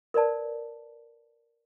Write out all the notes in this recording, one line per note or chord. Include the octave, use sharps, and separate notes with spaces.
A#4 B4 D5 A5